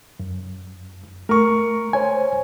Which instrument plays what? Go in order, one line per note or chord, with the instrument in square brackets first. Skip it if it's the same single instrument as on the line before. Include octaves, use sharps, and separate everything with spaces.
[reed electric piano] F#2
[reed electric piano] A3 [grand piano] A#4 C#6
[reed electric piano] C5 C#5 G#5